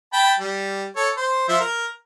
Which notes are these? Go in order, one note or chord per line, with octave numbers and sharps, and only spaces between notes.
G5 A5 B5
G3
A4 C#5
C5
F3 E5 C6
A#4